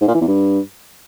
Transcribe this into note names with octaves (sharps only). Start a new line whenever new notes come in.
G#2
A#2
E3
E2
G2